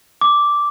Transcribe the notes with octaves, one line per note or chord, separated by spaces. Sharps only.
D6